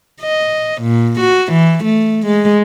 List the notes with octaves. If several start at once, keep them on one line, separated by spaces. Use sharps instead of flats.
D#5
A#2
F#4
E3
A3
G#3